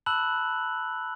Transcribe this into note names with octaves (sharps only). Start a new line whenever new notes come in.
A5 B5 E6 F#6 F#7